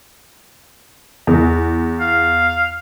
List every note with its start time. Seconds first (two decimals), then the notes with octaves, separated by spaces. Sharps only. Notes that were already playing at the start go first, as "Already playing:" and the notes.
1.27 E2
2.01 F5